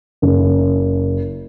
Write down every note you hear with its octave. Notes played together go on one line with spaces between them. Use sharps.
F#1